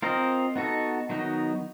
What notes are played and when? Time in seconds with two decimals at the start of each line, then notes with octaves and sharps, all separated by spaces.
0.02 C4 F4 A#4 D#5
0.56 B3 D#4 F#4 A4
1.09 D#3 F#3 B3 D#4 F#4